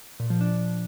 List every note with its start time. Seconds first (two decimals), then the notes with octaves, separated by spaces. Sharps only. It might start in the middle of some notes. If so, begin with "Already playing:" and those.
0.20 A#2
0.30 F3
0.41 D4